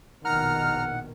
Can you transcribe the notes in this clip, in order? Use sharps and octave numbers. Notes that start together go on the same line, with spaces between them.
A#1 B2 D#3 F#5 A#5 F6